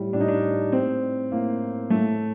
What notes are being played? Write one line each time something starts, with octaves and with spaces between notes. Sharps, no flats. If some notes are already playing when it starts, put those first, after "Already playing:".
Already playing: A2 G3
A2 D4
D#4
D4
A2 C4
A2 A#3
A2 A3